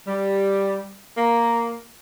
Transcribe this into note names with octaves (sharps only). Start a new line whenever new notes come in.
G3
A#3